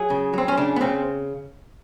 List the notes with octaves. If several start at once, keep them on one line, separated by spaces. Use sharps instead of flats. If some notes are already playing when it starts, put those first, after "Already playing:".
Already playing: F#3 G#4
C#3
F#3 C4
C#4
C#3 D4
B3
C#3 C4